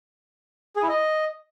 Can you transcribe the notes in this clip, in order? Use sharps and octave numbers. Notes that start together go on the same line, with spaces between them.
G#4
E4
D#5